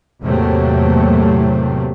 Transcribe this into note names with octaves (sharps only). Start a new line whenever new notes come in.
E2 A2 C3 F#3 A3 A#3